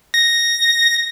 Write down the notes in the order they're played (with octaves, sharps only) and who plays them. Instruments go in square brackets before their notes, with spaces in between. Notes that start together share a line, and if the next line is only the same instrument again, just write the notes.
[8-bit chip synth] A#6